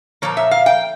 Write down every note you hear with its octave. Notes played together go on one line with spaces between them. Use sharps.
A#2 F3 A#3 C#5
E5
F5
G5